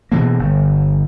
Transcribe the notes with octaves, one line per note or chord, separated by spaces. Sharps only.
B2 E3 A#3
G1